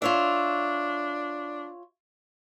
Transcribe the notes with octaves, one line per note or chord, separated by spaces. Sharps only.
D4 F4 C#5 E5